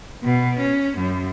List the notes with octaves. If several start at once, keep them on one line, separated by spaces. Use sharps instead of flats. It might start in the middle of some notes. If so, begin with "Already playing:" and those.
B2
C#4
F#2